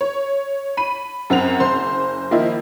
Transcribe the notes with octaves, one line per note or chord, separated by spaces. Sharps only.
C#5
B5 D#7
F#2 C4 F#5 F7
F#1 C5 C6
D#3 F3 A#3 D#4 E4